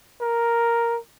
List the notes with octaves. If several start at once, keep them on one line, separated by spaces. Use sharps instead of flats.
A#4